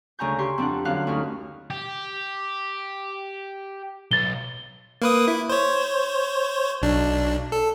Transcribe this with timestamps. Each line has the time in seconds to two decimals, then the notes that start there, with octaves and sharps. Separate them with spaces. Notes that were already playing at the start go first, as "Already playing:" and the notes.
0.19 D2 C#3 G#5 A#5 C#6 G6
0.39 G4 C6 C#6
0.58 F2 C4 D4 F#5
0.85 F#2 D3 F5 F#6
1.07 D2 C#4 D#4 F#4 F6
1.70 G4
4.11 B1 A6 G7
5.02 A#3 B4 D#6
5.28 E4
5.49 C5 C#5
6.82 B1 D4
7.52 A4